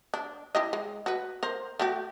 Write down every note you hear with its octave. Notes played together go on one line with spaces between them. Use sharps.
D4
E4 G4 D#5
G#3
F#4 B4
A#4 C5
A3 F#4 G4